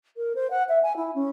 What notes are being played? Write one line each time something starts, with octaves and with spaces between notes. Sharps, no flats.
A#4
C5
F#5
E5
G#5
E4
C#4